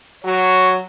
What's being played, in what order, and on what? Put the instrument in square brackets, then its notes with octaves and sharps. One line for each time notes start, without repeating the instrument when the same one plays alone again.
[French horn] F#3 [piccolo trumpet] C#5